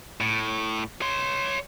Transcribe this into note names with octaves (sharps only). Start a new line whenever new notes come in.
A2
C#5 C6